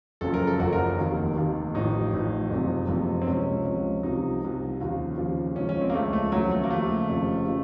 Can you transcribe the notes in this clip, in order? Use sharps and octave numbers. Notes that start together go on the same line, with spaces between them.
F#1 F#2 C#3 F3 A4
A#4
A4
F#1 F#2 C#3 F3 F#4
A#4
F1 D#2 D#3
F1 D#2 D#3
A1 A2 F3 D#4
A1 A2 F3
F#1 F2 C3 F3
F#1 F2 C3 F3
C4
C#2 C3 F3 C#4
C#2 C3 F3
C2 C3 F3 D#4
C2 C3 F3
D#2 C#3 F3
D#2 C#3 F3
C#2 C#3 F3 C#4
C#4
C4
A#3
C#2 C#3 F3 A3
A3
D#2 C#3 F3 F#3
A3
A#3
D#2 C#3 F3 A3
F1 F2 C#3 F3
C#3 F3